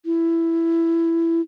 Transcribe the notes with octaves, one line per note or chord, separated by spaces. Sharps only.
E4